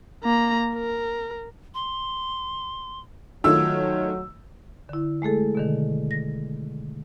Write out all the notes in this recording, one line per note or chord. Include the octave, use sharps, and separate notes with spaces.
A#3 A#5
A#4
C6
D#3 F#3 A3 F4 C#5 E6
D3 E4
G#3 A3 G#4 A4
B2 D3 D#3
A#6